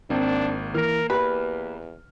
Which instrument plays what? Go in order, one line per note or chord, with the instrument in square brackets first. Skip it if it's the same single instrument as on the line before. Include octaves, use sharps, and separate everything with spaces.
[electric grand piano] G#1 A#3 [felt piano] C4 [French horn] D4
[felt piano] E3 [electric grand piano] A#3 F6 [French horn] A#4
[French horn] E2 [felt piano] G4 [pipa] B4